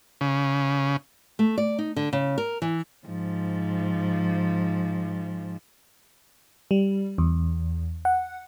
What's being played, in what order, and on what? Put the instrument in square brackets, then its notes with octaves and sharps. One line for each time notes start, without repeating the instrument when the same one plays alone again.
[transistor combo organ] C#3
[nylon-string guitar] A3
D5
D#4
D3
C#3
A#4
E3
[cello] G#2 F3
[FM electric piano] G3
E2
F#5